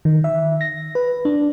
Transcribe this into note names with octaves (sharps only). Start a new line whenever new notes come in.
D#3
E5
A#6
B4
D4